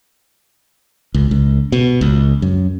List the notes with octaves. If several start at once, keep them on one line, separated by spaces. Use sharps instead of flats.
C#2
C#2
B2
C#2
F#2